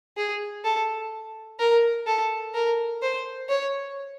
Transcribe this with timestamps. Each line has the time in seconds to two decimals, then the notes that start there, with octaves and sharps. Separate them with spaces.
0.17 G#4
0.64 A4
1.59 A#4
2.06 A4
2.54 A#4
3.02 C5
3.49 C#5